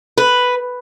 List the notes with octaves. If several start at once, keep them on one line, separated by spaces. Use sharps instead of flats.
B4